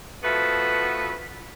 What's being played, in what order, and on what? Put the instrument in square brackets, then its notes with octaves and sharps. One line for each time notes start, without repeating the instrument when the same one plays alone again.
[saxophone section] F3 A3 B3 F#4 B4